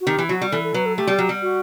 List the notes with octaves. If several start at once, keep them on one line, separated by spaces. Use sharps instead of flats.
F#4
D#3 G4
E3
F#3 F#4
G3
E3 A4
A4
F#3 B4
A4
A3 G4
G3
F#3
G3
F#4